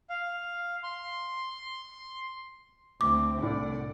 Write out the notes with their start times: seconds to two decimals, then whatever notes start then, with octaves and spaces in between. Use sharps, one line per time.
0.10 F5
0.83 C6
3.01 D2 C4 D6
3.42 C2 A2 D3 D5 F#5